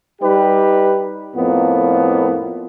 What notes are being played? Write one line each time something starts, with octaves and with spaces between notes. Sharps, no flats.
G3 D#4 G4 B4
F2 A2 A#3 B3